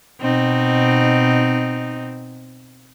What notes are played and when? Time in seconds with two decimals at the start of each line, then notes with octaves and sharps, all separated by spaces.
0.21 B2 C4 D#4